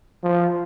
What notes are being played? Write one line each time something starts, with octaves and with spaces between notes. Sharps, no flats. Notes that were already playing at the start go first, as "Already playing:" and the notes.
F3